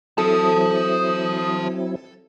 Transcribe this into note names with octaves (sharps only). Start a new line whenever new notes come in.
F#3 C4 E4 A4 C5 A5 D#6